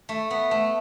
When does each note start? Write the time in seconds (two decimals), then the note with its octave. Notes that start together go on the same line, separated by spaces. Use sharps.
0.09 A3
0.31 B3
0.51 A3